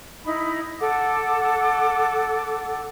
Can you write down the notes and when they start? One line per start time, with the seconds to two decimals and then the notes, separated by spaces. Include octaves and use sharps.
0.25 D#4 E4 B5
0.81 A4 F#5 D6